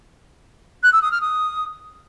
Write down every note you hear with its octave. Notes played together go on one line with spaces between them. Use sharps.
F#6
E6
D#6
F6
D#6